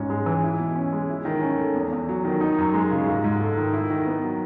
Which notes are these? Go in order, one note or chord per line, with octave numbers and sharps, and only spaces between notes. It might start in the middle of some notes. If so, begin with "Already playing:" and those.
Already playing: G#2 C#4
G#3
E3
E4
B2
C#4
G#3
E4
D#3
C#4
A3
E2
E2
F#3
D#3
D#4
F#2
G#3
C#3
G#2
G#2
A3
D#3
E4
D#3
B3
F#3